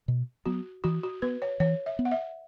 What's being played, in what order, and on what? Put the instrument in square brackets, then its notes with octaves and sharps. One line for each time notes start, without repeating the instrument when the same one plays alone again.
[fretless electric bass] B2
[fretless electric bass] F#3 B3 [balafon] F#4
[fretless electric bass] E3 [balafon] F#4
[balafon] F#4
[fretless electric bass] B3 [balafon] B4
[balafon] C#5
[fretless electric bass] E3 [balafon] C#5
[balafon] E5
[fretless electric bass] B3
[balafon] F#5
E5